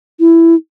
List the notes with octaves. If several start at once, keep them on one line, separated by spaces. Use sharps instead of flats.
E4